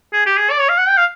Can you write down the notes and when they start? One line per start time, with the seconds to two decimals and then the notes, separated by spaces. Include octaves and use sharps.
0.13 G#4
0.26 G4
0.38 G#4
0.51 D5
0.60 C#5
0.69 F5
0.78 F#5
0.88 G5
0.97 F5